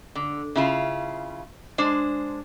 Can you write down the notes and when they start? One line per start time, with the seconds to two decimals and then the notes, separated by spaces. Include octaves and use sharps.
0.15 D3
0.56 C#3 E4 F4
1.78 G#3 D4 C5